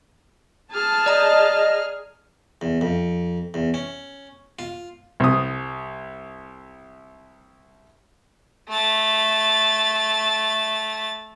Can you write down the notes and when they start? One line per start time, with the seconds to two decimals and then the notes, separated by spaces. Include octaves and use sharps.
0.72 G#4 A5 F6
1.06 D5 D#5 A#5
2.61 E2
2.81 F2
3.54 E2
3.74 C#4
4.59 F4
5.20 C2 D#6
8.69 A3 A6